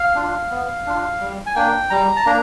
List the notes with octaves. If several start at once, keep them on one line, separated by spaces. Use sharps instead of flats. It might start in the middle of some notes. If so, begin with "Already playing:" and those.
Already playing: F5
D4 F4
B3
D4 F4
G3
G#5
A#3 D4 G5
G3 A#5
A5
A#3 D4 A#5